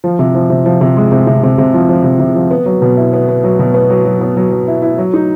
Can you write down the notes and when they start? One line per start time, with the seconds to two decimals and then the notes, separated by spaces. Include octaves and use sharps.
0.04 F3
0.19 C3
0.35 F3
0.50 C3
0.66 F3
0.81 C3
0.97 G#3
1.12 C3
1.27 C3
1.43 C3
1.58 C3
1.74 F3
1.89 F3
2.04 C3
2.20 C3
2.36 F3
2.51 B3
2.66 F#3
2.82 B2
2.97 E4
3.13 B3
3.28 B3
3.44 F#3
3.59 B2
3.74 B3
3.90 F#3
4.05 F#3
4.21 B3
4.37 F#3
4.51 F#3
4.68 E4
4.82 E4
4.98 F#3
5.14 D#4